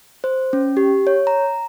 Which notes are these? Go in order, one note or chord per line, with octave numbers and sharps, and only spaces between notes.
C5
C#4
G4
C#5
A#5